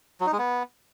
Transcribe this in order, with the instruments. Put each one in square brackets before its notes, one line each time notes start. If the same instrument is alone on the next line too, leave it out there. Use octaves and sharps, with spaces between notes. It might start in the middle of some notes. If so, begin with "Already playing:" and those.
[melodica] F#3
D#4
G#3
B3